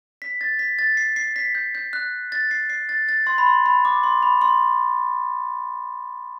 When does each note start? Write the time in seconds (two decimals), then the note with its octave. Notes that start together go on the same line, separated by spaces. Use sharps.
0.22 B6
0.41 A6
0.59 B6
0.79 A6
0.97 C7
1.16 C7
1.36 B6
1.55 G6
1.75 G6
1.93 F#6
2.32 A6
2.51 C7
2.70 C7
2.89 A6
3.09 A6
3.27 C6
3.38 B5
3.46 C6
3.66 B5
3.85 D6
4.03 C6
4.22 B5
4.41 C6